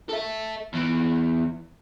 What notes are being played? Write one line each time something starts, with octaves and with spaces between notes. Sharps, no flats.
A4 E5
E2 E3